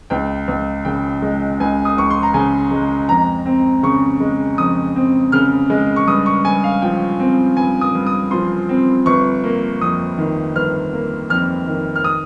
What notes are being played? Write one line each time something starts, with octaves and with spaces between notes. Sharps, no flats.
C#2 G5
C#2
C#3 G5
G#3
C#2 G#5
D#6
C#2 C#6
C6
A#5
C#3 G#5
G#3
F2 A#5
C4
C#3 C#6
G#3
F2 D#6
C4
C#3 F6
G#3
C#6
G2 D#6
C#6
G2 G#5
F5
F3 G5
C4
G2 G#5
D#6
G2
D#6
F3 C6
C4
G1 C#6
A#3
F2 D#6
D#3
G1 F6
A#3
F2 F6
D#3
F6
D#6